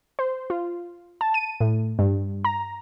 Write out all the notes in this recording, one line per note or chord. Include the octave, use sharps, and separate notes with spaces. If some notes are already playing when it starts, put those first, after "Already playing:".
C5
F4
A5
D#7
A2
G2
A#5